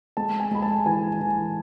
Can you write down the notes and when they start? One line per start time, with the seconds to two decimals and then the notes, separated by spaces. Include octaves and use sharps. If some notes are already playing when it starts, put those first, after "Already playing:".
0.17 G#3 A5
0.40 G#5
0.51 G#3 B5
0.62 A5
0.86 E3 G#5
1.20 E3